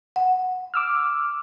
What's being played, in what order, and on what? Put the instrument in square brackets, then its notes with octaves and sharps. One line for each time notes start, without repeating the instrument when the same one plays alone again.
[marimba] F#5
[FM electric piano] D6 E6 F6